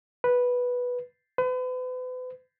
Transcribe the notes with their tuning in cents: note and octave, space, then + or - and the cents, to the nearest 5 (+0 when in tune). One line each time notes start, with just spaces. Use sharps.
B4 -5
B4 +40